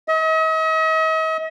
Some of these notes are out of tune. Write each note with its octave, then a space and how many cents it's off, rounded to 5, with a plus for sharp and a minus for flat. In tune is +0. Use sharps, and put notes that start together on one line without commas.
D#5 +45